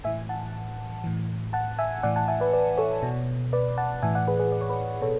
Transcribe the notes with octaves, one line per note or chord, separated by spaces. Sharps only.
A2 E3 E5 G#5
F#5 A5
A2 E3
F#5 A5
E5 G#5
A2 E3 D5 F#5
F#5 A5
E5 G#5
B4 D5
B4 D5
A4 C#5
B2
B4 D5
F#5 A5
A2 E3 E5 G#5
D5 F#5
G#4 B4
G#4 B4
D5
C#5
B4 D5
B2 A4 C#5